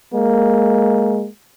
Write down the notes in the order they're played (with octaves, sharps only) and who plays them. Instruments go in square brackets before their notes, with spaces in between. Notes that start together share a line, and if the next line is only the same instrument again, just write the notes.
[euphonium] G#3 [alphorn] A#3